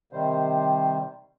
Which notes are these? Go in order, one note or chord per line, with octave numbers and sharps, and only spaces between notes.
C3 D#3 G3 C5